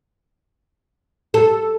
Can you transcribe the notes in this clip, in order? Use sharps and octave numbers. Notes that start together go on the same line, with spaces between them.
A4